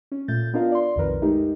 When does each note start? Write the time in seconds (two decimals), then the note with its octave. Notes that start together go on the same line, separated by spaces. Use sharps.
0.12 C#4
0.28 A#2 A3 G6 A6
0.53 B3 D4 F4 A#4 D#5 F5
0.72 D5 C6
0.96 B1 F2 D#3 A#4 B4
1.22 G#3 A3 D#4 G4 A#4